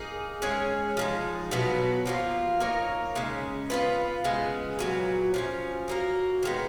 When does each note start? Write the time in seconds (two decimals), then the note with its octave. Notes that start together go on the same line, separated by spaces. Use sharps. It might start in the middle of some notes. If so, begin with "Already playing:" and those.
Already playing: A#3 D#4 G#4
0.42 G#3 C#4 G#4 C#5
0.97 F3 G#3 D#4
1.51 B2 F#3 B3
2.06 F3 A#3 F4
2.60 A#3 D#4 A#4 C#5
3.15 C#3 G#3 C#4
3.70 B3 F4 B4
4.24 C#3 G#3 B3
4.79 A#2 F#3 B3
5.34 F3 A#3 C#4
5.88 F#3 A#3 D#4 A#4
6.43 D#3 G#3 B3